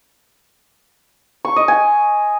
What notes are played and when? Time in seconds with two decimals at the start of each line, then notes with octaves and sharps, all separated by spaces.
1.45 C#6
1.56 D#5
1.68 G#5